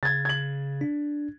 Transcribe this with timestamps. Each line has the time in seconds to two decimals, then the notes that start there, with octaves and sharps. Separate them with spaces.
0.03 C#3 G#6 A6
0.25 G#6 F#7
0.81 D4